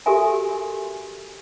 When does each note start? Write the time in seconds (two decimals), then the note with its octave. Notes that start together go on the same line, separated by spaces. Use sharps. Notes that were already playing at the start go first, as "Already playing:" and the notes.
0.06 F#4 G4 A4 A#4 E5 G#5